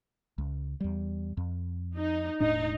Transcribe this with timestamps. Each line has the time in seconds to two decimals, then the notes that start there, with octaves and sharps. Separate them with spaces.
0.38 C#2
0.81 E2 G3
1.37 F2
1.97 D#4
2.40 E1 A2 D4 D#4